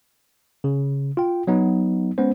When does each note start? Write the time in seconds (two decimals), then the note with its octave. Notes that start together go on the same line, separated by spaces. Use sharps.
0.64 C#3
1.17 F4 G5
1.47 F#3 B3 D#4
2.18 G#3 B3 C#4 C5